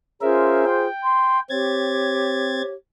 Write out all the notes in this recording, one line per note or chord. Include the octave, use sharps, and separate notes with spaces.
C#4 F4 G#4 A#4 C5 E5
G5
C6
C4 G4 C#5 G#6 A6